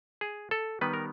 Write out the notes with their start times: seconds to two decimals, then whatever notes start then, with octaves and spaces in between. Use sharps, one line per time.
0.21 G#4
0.51 A4
0.81 D#3 G3 B3 B4
0.94 A#4